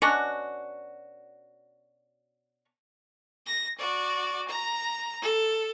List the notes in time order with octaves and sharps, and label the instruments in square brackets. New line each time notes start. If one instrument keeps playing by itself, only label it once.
[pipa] B2 C#4 D4 F#4
[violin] A#6
F#4 D5
A#5
A4